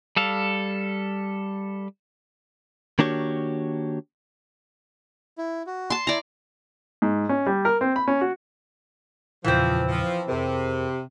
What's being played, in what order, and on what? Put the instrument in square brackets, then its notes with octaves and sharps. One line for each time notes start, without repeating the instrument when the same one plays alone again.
[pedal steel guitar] G3 A4 F5
[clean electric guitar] D#3 A#3 D4 F#4 G4 C#5
[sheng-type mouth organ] E4
F#4
[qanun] A5 C6
[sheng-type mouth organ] E4 [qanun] D5 A#5
[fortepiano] G#2
C#4
G3
A#4
C4
B5
C#4
F#4
[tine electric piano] E2 A#2 C#3 [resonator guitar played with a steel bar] E3 C4 [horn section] F3
[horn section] F3
[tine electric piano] F2 G#4 A#4 [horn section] C3